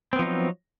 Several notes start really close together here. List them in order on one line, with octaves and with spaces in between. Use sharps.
C4 B3 F3 D#4 F#3